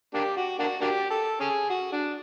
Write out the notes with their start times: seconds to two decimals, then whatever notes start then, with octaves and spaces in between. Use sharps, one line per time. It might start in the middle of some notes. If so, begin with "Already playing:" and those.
0.14 A#3 D4 G4
0.37 F#4
0.59 A#3 D4 F#4
0.81 A#3 D4 G4
1.10 A4
1.40 C#4 G#4
1.70 F#4
1.92 D4